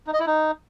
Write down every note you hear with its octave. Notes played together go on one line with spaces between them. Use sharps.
D#4
D#5
E4
D#4